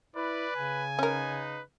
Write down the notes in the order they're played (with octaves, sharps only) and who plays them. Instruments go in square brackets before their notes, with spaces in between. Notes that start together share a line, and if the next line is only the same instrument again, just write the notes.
[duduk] E4 [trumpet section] B4 [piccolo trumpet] D5
[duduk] C#3 [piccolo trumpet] G#5
[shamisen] C#4 A#4 [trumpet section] D#4 B4